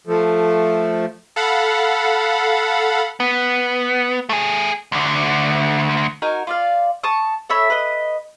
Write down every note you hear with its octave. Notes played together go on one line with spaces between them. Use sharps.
F3 A3
A4 F5 F#5 B5
B3
A3 G#4
D2 D3
D#4 F#4 A#4 G#5
F4 D5 F5
A5 C#6 D#6
A4 C#5 E5 B5
B4 D#5